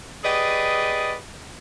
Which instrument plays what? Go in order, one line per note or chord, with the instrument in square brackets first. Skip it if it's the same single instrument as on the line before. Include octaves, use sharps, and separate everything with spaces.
[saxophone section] G4 G#4 B4 D5 D#5